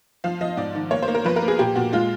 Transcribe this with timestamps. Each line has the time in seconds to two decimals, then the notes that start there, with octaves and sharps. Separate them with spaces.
0.24 F3 F5
0.41 F3 D#5
0.57 G#2 D5
0.75 D#3
0.91 A#3 C#5
1.03 C5
1.08 A#3
1.15 A#4
1.25 F3 B4
1.36 A#4
1.42 A#3
1.48 G#4
1.59 A#2 G4
1.75 A#2 F#4
1.93 G#3 F4